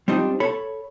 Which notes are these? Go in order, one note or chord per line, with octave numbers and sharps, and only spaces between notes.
G3 C4 D4 D#4 F4
A4 C#5 B5